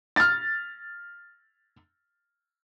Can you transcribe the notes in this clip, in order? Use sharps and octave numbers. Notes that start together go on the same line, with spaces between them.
F6 A6